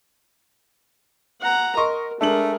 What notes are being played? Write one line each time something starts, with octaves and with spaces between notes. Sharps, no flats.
F#5 A#5
A#4 D#5 C6 C#6
G#3 A3 D4 A#4 F#7